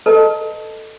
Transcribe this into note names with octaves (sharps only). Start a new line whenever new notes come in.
A4 B4 D#5 A5 A#5